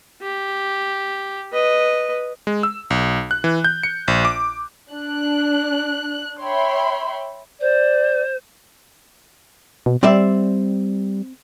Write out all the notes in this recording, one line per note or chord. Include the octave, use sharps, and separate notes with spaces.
G4
B4 D#5
G#3
E6
B1
F#6
E3
G6
C#7
A#1
D6
D4 F#6
C#5 E5 G5 B5 C6
C5 D5
B2
G3 C4 D5 E5